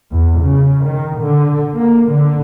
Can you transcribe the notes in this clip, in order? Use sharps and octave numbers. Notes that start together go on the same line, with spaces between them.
E2
C#3
D#3
D3
A#3
D3